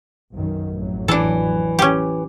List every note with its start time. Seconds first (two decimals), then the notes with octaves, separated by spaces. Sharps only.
0.33 B1 F#2 D#3
0.71 A1 F2 F#3
1.08 E3 D4 A4
1.79 C#4 G4